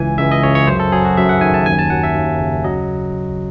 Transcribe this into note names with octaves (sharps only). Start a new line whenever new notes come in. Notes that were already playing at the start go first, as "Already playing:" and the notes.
Already playing: C#2 E3 G#5
C#2 E5
D#5
C#3 C#5
C#5
F#2 C5
A4
F#3 G#4
F#4
F#2 E5
F#5
D#3 G#5
A5
D#2 G#5
A5
F#3 F#5
E5
D#2
C#3
F#3 D#5